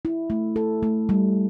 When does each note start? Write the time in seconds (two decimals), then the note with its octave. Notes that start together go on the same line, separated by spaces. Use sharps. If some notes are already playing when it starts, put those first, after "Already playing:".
0.05 E4
0.30 A3
0.56 A4
0.83 A3
1.09 G3